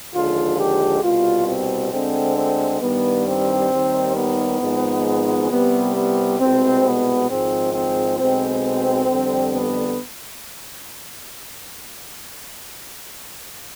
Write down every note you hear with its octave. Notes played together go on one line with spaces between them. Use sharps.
D#2 D3 F3 G#3 F4
G4
C2 B2 G3 F4
C4
D2 D3 G#3 C4
C4
G2 D#3 G3 B3
C4
D#2 D#3 G3
B3
G#1 G#2 F3 G#3
C2 C3 G3 B3
B3
C2 B2 G#3 C4
B3
G#1 G#2 F3 G#3 C4
C4
B1 B2 G#3 C4
F2 D3 G3
B3